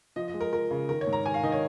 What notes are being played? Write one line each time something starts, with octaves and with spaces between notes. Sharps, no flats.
F3 D#5
D#5
G#3
A#4
F3 A#4
C#3
D#3 A#4
C#5
G#2
A#5
D#3 G#5
F5
D#3 D#5
C#5